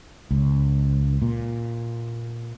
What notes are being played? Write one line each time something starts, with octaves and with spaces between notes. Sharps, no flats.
C#2
A#2